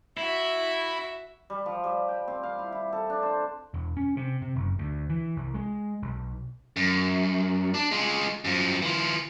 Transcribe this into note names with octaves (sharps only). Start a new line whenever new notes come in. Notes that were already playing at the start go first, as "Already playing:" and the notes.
E4 F#4 E5
G3
F3
G3
G5
C4
F5
E4
E4
A4
D4
C5
E1
C#4
C3
C3
F#1
D2
E3
C2
G#3
B1
F#2
D4
G#3 F4
F#2 F3
E3 F4